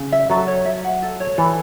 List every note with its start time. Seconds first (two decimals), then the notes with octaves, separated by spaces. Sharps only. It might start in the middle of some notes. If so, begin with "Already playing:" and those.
Already playing: C#3
0.12 E5
0.30 F#3 A4
0.47 C#5
0.65 E5
0.84 F#5
1.02 A4
1.20 C#5
1.38 E3 A4